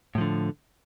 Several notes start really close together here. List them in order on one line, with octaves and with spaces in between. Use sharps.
A2 F3 D3